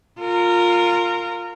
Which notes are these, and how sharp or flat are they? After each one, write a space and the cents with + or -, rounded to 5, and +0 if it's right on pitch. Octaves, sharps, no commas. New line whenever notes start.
F4 +10 A#4 -20